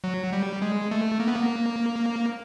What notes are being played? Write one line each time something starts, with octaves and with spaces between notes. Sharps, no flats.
F#3
G3
G#3
A3
A#3
B3
A#3